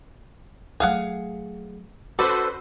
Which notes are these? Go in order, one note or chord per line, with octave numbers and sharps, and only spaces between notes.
F#3 A3 G#4 F5 F#5
C#4 F#4 A4 B4 C5 D5